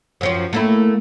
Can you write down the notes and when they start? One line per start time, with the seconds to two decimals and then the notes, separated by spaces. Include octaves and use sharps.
0.21 F#2 F3 C#4
0.53 A3 A#3 E4